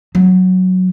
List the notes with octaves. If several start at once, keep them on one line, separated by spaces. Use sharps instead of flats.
F#3